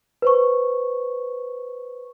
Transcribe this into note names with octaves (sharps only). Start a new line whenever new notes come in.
B4 C5 C#6